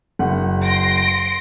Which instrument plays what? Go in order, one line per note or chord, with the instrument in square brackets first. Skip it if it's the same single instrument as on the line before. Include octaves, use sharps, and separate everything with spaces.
[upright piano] F#1 F#5
[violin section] C6 A#6 D7